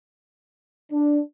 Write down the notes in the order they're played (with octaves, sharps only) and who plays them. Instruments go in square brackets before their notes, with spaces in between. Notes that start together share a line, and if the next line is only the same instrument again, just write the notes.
[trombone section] D4